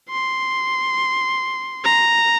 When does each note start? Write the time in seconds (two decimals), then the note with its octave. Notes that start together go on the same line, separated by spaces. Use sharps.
0.10 C6
1.85 A#5